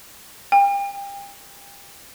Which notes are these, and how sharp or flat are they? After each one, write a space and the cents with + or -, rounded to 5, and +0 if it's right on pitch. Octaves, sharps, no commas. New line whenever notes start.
G5 +35